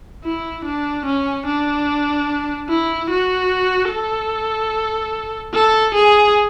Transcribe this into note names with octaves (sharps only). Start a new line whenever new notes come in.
E4
D4
C#4
D4
E4
F#4
A4
A4
G#4